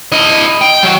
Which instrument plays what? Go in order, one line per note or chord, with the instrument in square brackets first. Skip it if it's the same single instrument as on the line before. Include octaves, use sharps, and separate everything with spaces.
[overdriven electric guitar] E4 D#5
G5
F#3